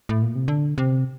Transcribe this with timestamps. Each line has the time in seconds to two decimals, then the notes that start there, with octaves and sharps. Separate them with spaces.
0.09 A2
0.22 A#2
0.36 C3
0.48 D3
0.78 C3